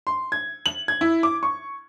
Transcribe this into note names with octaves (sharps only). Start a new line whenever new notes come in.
C6
G#6
F#7
G#6
E4
D6
C#6